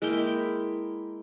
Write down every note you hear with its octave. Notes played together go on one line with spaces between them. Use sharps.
G#3 A#3 E4 G5